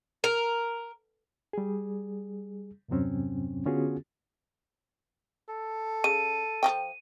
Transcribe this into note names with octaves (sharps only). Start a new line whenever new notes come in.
A#4
G3 G#4
E2 G2 C3 F#3 C4 C#4
D3 B3 C#4 F4 F#4 G#4
A4
C#3 D#7
F3 D#5 G5